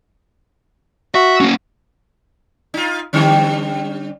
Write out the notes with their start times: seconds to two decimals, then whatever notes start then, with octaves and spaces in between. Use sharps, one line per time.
1.15 F#4 E5
1.41 A#3 C#4
2.74 D#4 F4
3.13 D3 G3 C#4